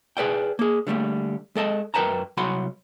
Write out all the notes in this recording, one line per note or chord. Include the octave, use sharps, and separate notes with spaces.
G#4 B4 D5 G5
A#3 G#4
D3 G3 A3 A#3
G#3 A4 D#5 A5
F#2 A#4 B4 G5 A5 A#5
C2 F#3 F#4 B5 C6